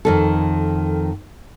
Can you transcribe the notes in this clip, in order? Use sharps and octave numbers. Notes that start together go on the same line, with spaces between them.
F2 D#3 A4